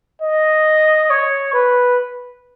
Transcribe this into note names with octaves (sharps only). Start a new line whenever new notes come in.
D#5
C#5
B4